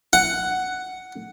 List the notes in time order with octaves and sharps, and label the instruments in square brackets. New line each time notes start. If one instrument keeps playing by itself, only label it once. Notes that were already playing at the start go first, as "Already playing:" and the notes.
[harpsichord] F#5